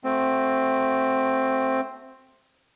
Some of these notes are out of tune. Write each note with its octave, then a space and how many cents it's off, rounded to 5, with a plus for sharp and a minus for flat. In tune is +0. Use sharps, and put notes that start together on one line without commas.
A3 +0 C4 +10 F#4 +0